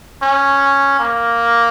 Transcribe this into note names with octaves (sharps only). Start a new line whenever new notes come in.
C#4
A#3